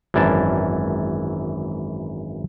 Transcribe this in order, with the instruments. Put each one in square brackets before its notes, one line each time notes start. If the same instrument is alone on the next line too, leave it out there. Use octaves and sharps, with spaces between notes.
[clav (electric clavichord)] G#1 F#2 E3 A#4 D5 A5